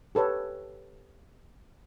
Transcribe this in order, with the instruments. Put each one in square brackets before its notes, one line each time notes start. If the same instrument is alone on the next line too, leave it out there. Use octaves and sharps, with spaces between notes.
[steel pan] G4 A4 B4 C#5